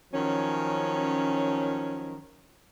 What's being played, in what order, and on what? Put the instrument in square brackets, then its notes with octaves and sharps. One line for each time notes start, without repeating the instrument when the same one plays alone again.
[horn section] D#3 F3 F#3 C#4